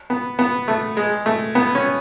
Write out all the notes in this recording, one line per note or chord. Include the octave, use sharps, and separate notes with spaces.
B3
B3
A3
G#3
A3
B3
C#4